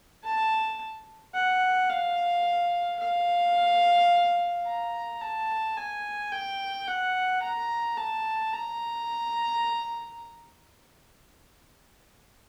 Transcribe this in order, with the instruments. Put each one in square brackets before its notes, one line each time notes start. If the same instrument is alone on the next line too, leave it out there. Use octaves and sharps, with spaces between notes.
[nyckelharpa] A5
F#5
F5
F5
A#5
A5
G#5
G5
F#5
A#5
A5
A#5